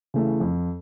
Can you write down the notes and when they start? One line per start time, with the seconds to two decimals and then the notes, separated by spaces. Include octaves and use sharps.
0.14 C#3 E3 A3
0.40 F2